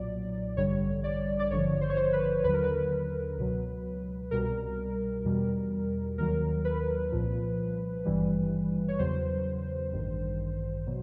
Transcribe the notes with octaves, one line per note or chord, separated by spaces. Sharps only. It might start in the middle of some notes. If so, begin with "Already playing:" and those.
Already playing: B1 A#2 F#3 D5
A1 G2 D3 G3 C#5
D5
D5
G#1 G2 D3 F3 C#5
C5
C#5
C5
B4
D#2 D3 F#3 B4
A#4
B4
C#2 B2 F#3
C2 B2 G3 A#4
E2 B2 G3
D#2 D#3 F#3 A#4
B4
C2 A#2 F3
G#1 G2 E3 G3
C#5
E2 C#3 F#3 C5
A1 G2 D#3
B2 F#3